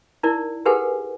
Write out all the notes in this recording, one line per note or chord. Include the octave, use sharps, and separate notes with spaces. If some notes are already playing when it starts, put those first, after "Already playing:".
D#4 E4 A#4 D5
G4 G#4 A#4 B4 F#5 G#5